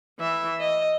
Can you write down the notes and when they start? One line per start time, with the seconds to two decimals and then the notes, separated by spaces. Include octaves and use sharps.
0.19 E3 E5
0.60 D#5